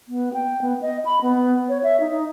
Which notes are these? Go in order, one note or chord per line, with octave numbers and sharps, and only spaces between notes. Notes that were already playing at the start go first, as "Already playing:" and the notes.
B3
G5
B3
D#5
B5
B3
C#5
E5
D#4